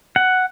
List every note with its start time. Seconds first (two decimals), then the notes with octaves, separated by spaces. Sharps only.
0.16 F#5